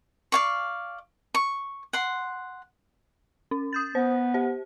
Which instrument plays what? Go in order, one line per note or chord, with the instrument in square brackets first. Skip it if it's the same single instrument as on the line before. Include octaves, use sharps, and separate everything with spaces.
[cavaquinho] D5 F5 C#6
C#6
F#5 C6
[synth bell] C#4
D#6 G6 A6
[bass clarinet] B3 [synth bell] C5
[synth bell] G4 C5